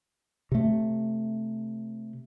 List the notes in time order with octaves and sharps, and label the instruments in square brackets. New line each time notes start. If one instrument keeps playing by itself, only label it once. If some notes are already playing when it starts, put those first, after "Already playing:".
[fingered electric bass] C3 A3